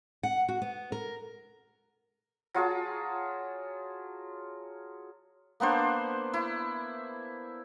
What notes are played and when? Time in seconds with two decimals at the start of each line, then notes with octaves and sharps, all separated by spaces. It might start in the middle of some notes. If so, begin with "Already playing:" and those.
0.23 F#5
0.49 F#4
0.62 B3
0.92 A#4
2.54 F#3 F4 G#4 A5
5.60 A#3 B3 D4 C5
6.33 E4